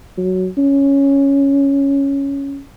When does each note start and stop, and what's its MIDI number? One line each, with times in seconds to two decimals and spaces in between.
0.18 0.48 54
0.58 2.60 61